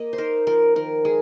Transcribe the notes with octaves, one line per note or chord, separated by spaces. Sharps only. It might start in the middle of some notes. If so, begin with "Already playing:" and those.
Already playing: A#3 D#5
C5
D#4 A#4
F3 A#4
D#3 A#4
G#3 G#4